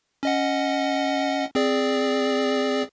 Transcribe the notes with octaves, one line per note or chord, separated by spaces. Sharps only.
C#4 D#5 F#5
C4 G#4 D5